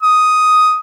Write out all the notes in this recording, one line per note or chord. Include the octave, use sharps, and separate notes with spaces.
D#6